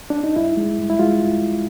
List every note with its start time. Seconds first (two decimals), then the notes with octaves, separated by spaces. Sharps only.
0.10 D4
0.24 D#4
0.36 G2 E4
0.57 G#3
0.78 G2
0.90 E4
0.99 G#3 F4